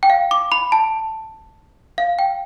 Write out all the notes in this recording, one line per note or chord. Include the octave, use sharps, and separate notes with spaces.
G5
F5
D6
B5
A5
F5
G5